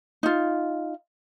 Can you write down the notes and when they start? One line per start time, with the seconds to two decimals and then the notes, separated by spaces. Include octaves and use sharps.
0.23 D#4 F4